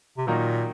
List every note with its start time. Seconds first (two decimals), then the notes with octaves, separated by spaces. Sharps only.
0.17 C3
0.27 A#2 D#3 F#3 A#3 D#4